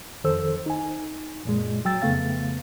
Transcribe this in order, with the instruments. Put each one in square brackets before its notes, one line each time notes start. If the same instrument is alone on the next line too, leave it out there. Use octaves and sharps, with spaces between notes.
[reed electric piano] F2 D#3 A4 C5 E6
D#4 G#5
F#2 A#2 G#3
F#3 G5 E6 A6
F2 C#3 A3 B3 F5 A6